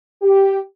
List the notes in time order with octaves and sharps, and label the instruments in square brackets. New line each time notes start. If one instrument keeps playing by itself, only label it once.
[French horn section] G4